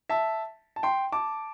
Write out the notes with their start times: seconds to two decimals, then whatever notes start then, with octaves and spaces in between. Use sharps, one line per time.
0.10 E5 A5
0.76 A5
0.83 G5 C6
1.12 A5 D6